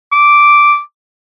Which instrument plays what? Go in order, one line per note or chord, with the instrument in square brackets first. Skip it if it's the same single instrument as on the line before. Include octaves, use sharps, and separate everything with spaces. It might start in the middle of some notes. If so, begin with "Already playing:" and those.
[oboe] D6